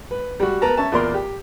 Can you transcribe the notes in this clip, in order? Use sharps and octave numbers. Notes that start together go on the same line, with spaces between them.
B4
G3 F#4
B3 A#4 B4 A5 A#5
C#4 E5 A5
E2 A#2 A#4 D5 C6
G4